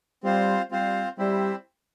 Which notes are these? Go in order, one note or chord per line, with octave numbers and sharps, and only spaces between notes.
G3 C4 F4 C5
G3 C4 F4 C5
G3 C4 E4 G4 C5 E5